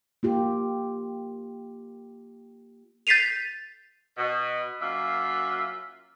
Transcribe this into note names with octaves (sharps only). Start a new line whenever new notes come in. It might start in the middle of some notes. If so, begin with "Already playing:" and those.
A#3 F4 G4
G6 A6 B6 C7 D#7 F7
B2
F#2 A#3 F4 E5